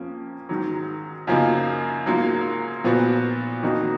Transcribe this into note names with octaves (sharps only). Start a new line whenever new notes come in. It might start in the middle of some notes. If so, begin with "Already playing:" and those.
Already playing: F2 F3 A#3 C#4
G#2 D#3 F#3
F#2 C#3 F3 A#3 D#4
G#2 F#3 A#3 F4
A#2 F3 B3 F#4
F2 D#3 A#3 D#4 F#4